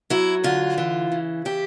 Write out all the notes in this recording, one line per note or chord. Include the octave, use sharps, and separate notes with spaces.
F#3 E4
D3 F4
E3
C#3
E3 G4